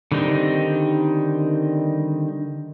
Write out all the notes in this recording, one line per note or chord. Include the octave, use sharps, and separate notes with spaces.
D3 D#3 G3 C4 D#4